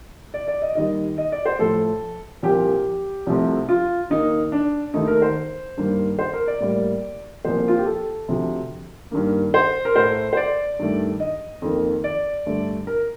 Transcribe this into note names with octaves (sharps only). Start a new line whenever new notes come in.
D5
D5
D#5
D#2 D#3 G3 D#5
D#5
D5
C5
A2 F3 A3 A4
C2 A#2 F3 A#3 G4
C2 C3 F3 A3
F4
D#2 D#3 A#3 D#4
D4
D#2 D#3 A3 D#4
A#4
C5
G2 D#3 G3 A#3
C5
A#4
D5
A2 G3 A#3 D5
C2 A#2 F3 A#3 C5
F4
G4
A4
D2 C3 F3
G2 D#3 A#3
C5
A#4
A2 A3 C5
C5
D5
G2 D#3 A3
D#5
F2 D#3 A#3
D5
G2 D3 A3
A#4